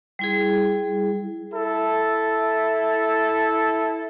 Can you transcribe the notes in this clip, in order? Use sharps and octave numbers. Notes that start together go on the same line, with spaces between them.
G3 E4 G#4
E4 A4